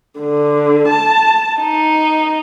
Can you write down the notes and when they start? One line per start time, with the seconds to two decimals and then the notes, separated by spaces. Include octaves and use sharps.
0.20 D3
0.88 A5
1.59 D#4